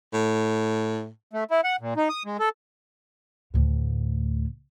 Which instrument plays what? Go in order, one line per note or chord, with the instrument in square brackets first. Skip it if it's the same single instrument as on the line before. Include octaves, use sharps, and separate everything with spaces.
[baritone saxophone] A2
[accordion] A3
E4
F#5
A#2
D#4
D#6
G#3
A4
[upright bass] D2 A2